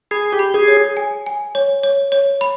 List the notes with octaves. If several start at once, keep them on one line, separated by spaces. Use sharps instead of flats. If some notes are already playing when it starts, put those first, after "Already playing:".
G#4 B5
G4
B5
G#4
C#5
G#5
G#5
C#5
C#5
C#5
B5